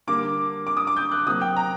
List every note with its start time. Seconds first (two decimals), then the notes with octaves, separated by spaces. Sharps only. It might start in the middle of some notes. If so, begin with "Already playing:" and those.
0.07 D3 G3 A#3 D6
0.67 D6
0.77 D#6
0.87 D6
0.97 G6
1.12 F#6
1.26 C3 F#3 A#3 D#6
1.41 G5
1.57 A#5